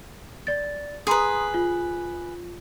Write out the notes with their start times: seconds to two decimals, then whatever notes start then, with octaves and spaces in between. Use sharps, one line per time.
0.47 D5 A6
1.07 G#4 B4 A#5 C6 D#6
1.54 F4